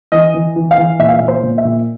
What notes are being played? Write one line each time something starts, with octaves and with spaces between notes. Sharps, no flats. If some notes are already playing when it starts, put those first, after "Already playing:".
E3 D#5
E3
E3
F5
E3
A#2 E5
F5
E5
A#2
C5
A#2
E5
A#2